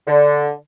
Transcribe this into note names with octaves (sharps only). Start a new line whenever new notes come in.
D3